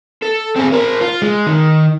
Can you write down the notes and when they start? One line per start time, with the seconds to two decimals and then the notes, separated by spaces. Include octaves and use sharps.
0.23 A4
0.56 C4 G#4
0.72 A#4 C5
1.01 F4
1.22 G#3
1.47 D#3